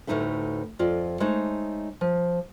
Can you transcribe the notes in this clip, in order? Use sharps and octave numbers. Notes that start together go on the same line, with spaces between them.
D2 A2 D#3 D#4 B4 E5
F2 F4 D5 D#5
G#3 A3 D#4 C5 C#5
F3